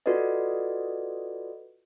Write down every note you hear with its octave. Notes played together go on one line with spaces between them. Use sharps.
F4 F#4 A4 B4 D5 D#5